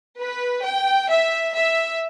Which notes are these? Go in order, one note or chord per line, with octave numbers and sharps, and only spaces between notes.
B4
G5
E5
E5